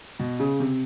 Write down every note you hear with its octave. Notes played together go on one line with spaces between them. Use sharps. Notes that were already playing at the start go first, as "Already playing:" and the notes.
B2
C#3
C3